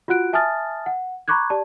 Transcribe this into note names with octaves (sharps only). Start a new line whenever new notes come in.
F4 F#4 F#5 F#6 D7
E5 G#5 A5 D#6 F6 A6
F#5
A#5 B5 C#6 D6 F#6 G#6
G4 D5 A5